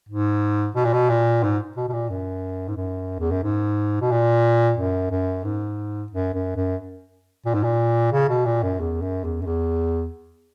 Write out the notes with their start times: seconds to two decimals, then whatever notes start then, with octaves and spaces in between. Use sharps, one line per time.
0.09 G#2
0.76 B2
0.85 A#2
0.93 B2
1.10 A#2
1.43 G#2
1.77 B2
1.89 B2
1.93 A#2
2.10 F#2
2.68 G#2
2.76 F#2
3.19 E2
3.31 F#2
3.43 G#2
4.01 B2
4.11 A#2
4.78 F#2
5.11 F#2
5.44 G#2
6.12 F#2
6.34 F#2
6.56 F#2
7.46 A#2
7.54 G#2
7.63 A#2
8.12 C#3
8.29 B2
8.45 A#2
8.63 F#2
8.80 E2
9.01 F#2
9.24 E2
9.42 F#2
9.46 E2